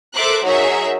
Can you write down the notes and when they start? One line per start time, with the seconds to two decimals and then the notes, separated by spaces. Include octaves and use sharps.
0.15 A4 A#4 C5 E5 D6 F#6
0.44 F#3 D#4 F#4 G#4 A#4 E5